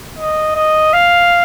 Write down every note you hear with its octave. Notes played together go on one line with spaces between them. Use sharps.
D#5
D#5
F5